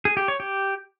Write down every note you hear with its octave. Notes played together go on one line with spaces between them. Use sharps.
G#4
G4
C#5
G4